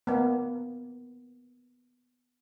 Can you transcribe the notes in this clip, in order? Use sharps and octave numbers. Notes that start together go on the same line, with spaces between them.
A#3 B3